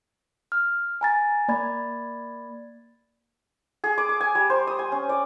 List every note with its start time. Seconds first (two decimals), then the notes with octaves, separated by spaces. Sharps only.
0.52 F6
1.01 G#5 A#5 A6
1.48 A#3 D5 B5 G#6 A6
3.84 G#4
3.98 D6
4.09 D6
4.21 G#5
4.35 G3
4.50 C5
4.67 D#6
4.79 G#5
4.92 C#4
5.09 D5